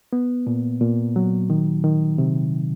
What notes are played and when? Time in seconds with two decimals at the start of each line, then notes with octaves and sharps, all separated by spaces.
0.13 B3
0.47 A#2
0.81 A#2
1.16 F#3
1.50 D#3
1.84 D#3
2.18 C3